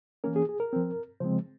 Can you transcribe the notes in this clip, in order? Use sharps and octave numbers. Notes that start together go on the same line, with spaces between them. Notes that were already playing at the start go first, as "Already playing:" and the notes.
E3 A#3 C#4 A#4
G#4
G#4
A#4
F3 C4
C#3 F3 G#3 C4 C5